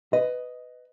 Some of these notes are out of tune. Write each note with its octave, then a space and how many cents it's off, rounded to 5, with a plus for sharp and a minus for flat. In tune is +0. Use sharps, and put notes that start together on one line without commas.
B4 +15 D#5 +0